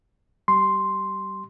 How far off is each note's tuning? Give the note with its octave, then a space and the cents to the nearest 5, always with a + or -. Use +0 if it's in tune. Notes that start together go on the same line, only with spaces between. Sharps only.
G3 -25 C6 +0